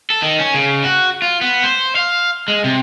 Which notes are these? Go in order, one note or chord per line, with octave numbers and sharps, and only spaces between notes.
A4
D#3
C#4
C#3
F#4
F4
B3
C5
F5
G#3
C3